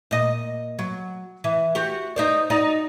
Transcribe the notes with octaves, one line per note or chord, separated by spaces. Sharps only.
A#2 D#5
F#3
E3
F#4 G4
D#4 C5 D5
D#4 F#4 D5